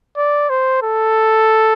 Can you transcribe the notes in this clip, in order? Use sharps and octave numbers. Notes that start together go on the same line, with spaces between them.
D5
C5
A4